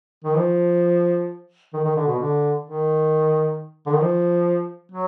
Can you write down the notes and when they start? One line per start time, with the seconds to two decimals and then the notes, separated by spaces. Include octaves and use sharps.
0.24 D#3
0.36 F3
1.73 D#3
1.84 D#3
1.96 D3
2.08 B2
2.19 D3
2.63 D#3
3.86 D3
3.93 D#3
4.01 F3
4.92 F#3